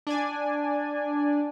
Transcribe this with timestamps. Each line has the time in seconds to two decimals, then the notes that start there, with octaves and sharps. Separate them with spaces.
0.07 D4 D5 G#5